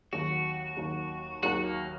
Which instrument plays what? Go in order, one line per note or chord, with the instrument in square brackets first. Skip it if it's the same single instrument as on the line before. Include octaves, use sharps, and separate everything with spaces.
[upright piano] D#2 D#3 F#3 [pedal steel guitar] F#4
[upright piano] D#2 D#3 F#3
[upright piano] D#2 D#3 F#3 [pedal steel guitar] F#4
[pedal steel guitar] A#3